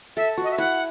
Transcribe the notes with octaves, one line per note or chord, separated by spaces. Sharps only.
A4 E5
F#4
D#5
E5
E4 F#5